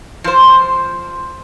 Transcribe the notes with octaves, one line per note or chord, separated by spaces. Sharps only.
F3 C5